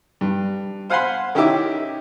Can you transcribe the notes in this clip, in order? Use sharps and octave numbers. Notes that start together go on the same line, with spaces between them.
G2
C5 F5 F#5 G#5 B5 C6
D#3 C#4 E4 G4 E5 D6